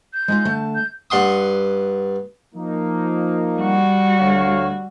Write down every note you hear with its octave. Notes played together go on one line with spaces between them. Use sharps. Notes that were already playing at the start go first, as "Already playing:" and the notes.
G6
G#3 D#4 F4
D3 A3 A5
G6
G2 F#5 C6 D#6
F3 A#3 D#4
G3 F#4
D2 C#5 F5